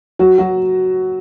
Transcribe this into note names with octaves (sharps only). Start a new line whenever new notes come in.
F#3 F#4
F#3 F#4